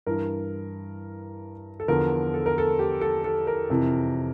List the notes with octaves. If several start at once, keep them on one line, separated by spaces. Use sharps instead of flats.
G2 E3 A#4
A4
E2 D3 F3 A#4
A4
A#4
A4
G4
A4
A4
A#4
F2 C3 E3